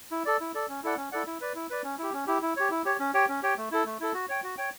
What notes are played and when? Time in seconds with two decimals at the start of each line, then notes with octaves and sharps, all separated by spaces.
0.11 E4
0.25 A4 D5
0.40 E4
0.55 A4 D5
0.69 C#4
0.84 E4 A4 D5 F#5
0.97 C#4
1.12 E4 A4 D5 F#5
1.26 E4
1.41 B4 D5
1.55 E4
1.70 B4 D5
1.84 C#4
1.99 E4 G4
2.13 C#4
2.27 E4 G4
2.42 E4
2.57 G4 C#5
2.71 E4
2.85 G4 C#5
2.99 C#4
3.14 G4 C#5 G5
3.29 C#4
3.43 G4 C#5 G5
3.57 A3
3.72 E4 A4
3.86 A3
4.00 E4 A4
4.14 F#4
4.29 C#5 G5
4.43 F#4
4.58 C#5 G5